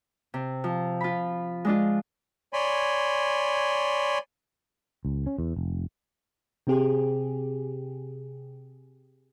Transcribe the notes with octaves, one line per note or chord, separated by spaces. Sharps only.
C3
F3
F4 B5
G#3 D4 F4
C#5 D5 G#5 B5 C6
C#2
C#4
E2
F1
C3 C4 G4 G#4